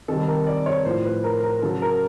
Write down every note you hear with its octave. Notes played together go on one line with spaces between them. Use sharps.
C3 D#3 G3 A4
A#4
D5
C#5
A2 F3 C5
B4
A#4
A#4
C#3 F#3 A4
A#4